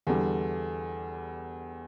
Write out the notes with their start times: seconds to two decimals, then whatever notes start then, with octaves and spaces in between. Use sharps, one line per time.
0.07 E2 D3 G3